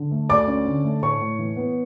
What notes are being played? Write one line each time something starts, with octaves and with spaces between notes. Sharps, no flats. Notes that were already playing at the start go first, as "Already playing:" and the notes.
Already playing: D3
A3
D2 D5 D6
C#4
D3
A3
A2 C#5 C#6
A2
E3
B3